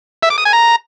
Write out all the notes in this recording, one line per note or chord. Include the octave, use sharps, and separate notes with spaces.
E5
D6
D#6
G#5
A#5